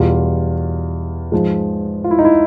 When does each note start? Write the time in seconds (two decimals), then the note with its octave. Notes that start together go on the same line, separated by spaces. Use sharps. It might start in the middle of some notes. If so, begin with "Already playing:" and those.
Already playing: E2 B2 G3 F4
1.32 G#2 F3 G#3
2.04 F4
2.11 E4
2.19 D#4
2.25 E4